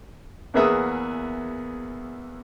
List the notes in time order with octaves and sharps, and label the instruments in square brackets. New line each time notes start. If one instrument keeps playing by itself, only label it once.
[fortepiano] E2 A#3 B3 G#4 E5 D#6